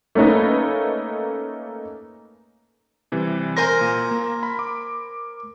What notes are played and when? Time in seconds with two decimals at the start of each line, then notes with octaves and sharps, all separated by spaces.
0.15 A3 A#3 C#4 D#4 B4
3.12 C3 E3 G3
3.57 A#4 C5 G#5 A#6
3.81 A#2
4.11 A#3
4.43 B5
4.59 D6